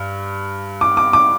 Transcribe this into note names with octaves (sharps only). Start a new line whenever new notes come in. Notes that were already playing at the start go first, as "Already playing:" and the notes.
Already playing: G2
D6
D6
D6